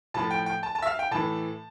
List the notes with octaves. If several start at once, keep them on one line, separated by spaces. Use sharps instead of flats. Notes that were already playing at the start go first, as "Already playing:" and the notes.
A2 F3 A5
G5
G5
A5
A5
E5
F5
G5
A2 E3 A5